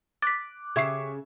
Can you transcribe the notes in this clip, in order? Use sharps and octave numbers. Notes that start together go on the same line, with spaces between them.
D6 F#6 A6 B6
C#3 G4 E5 C#6 G#6 C7